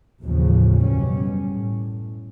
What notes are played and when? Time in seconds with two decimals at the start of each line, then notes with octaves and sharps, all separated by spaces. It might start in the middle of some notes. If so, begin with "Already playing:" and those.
0.22 A1 D#2 A2 C#3 F3
0.79 F#2 B2 G3 C#4
1.40 A2